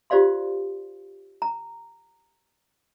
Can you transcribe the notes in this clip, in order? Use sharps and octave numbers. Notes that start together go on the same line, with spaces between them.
F4 G4 C5 D5 F5 C6
A#5